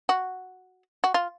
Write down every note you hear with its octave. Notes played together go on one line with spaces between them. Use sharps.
F#4
F#4
F4